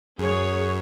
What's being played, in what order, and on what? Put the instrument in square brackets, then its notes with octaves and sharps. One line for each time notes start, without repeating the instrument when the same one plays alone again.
[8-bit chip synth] F#2 [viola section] G#4 C#5